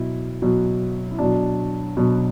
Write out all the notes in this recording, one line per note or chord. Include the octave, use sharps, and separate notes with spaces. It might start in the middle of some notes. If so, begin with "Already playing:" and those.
Already playing: B2 F#3 E4
B2 F#3
E4
B2 F#3 D4
B2 F#3